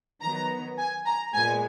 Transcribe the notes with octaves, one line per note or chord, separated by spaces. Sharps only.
D#3 F#3 B3 A#5
G#5
A#5
A#2 G#3 B3 G#5